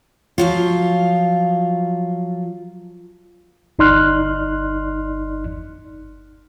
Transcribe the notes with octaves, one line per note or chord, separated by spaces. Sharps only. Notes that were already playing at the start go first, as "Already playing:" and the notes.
F3 F#3 F4
G1 D#4 D5 C6 F6 F#6